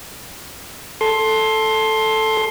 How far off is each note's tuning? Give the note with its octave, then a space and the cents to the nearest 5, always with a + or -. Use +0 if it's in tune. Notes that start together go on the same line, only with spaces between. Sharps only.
A4 +0 C6 +15